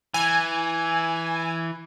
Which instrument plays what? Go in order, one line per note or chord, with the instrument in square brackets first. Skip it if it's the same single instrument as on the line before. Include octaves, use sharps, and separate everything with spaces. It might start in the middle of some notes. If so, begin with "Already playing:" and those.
[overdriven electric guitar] E3 [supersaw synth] G#5